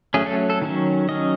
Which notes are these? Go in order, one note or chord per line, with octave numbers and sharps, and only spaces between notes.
F#3 A3 C#4 G#4
A4
A4
D#3 F#3 C#4
D#3 F#3 C#4 D#5